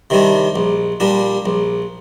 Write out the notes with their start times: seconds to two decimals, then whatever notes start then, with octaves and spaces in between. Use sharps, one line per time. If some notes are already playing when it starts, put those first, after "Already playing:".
0.10 C3 D#3 G3 D4
0.56 A#1
1.00 A#2 G3 D4
1.46 A#1